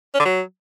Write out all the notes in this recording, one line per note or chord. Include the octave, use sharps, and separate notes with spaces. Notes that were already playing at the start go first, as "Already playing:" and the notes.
C#4
D3
F#3